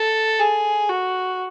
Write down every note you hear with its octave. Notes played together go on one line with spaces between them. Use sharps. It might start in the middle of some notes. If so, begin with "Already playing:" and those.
Already playing: A4
G#4
F#4